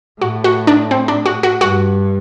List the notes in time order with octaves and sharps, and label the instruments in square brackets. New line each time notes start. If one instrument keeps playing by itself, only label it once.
[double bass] A2 [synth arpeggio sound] F#4
[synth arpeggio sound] F#4
D4
C4
D4
F#4
F#4
[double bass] G2 [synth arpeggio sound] F#4